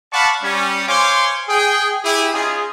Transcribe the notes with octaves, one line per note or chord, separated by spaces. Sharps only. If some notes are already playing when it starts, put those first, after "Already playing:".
D5 F5 F#5 A5 B5 C#6
G3 C#4
C5 C#5 F5 G#5 C6 D6
G#4 G5
E4 G4 G#4
C#4 D#4 F4 G#4